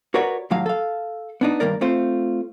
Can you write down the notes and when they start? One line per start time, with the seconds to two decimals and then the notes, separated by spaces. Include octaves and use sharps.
0.14 F#4 A#4 B4 C#5 D5 F#5
0.51 D#2 A2 F#3 F5
0.66 A4 F5
1.41 B3 D4 D#4
1.60 G2 D#3 A#3 A#4 D5
1.81 A3 C4 F4 C5